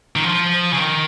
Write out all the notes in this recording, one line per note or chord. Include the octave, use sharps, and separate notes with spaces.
D#3
F3
C#3
D#3